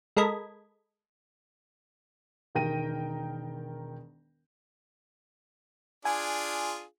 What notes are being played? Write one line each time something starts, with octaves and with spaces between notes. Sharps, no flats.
G#3 A4 A#4 D#5 B5 G#6
E1 D#3 A#4 G5 A#6 D#7
D4 F4 G#4 G#5